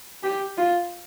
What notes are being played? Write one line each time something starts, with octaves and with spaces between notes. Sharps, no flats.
G4
F4